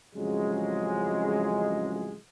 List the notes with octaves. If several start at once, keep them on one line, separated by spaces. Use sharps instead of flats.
A1 F2 C#3 F#3 G#3